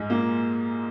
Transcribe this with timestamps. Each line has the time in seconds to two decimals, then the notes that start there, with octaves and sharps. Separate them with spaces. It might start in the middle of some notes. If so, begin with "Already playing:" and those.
Already playing: G#2 G#3
0.10 A#2 A#3